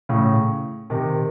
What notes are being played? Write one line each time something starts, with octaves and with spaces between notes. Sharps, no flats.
A2 C#3
C3 D#3